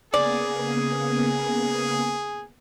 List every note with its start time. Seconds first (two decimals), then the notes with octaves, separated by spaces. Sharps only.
0.14 C#3 A#3 B3 G#4 D5